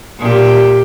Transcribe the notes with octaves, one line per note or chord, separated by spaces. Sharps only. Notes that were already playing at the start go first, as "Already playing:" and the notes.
A#2 G4